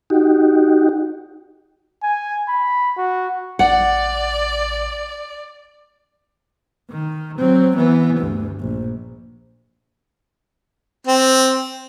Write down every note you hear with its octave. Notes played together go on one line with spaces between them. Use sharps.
D#4 F#4 G4
G#5
B5
F#4
A1 D5 F#5
D#3
F#3 C4
E3 B3
D2 G2
A#1
C4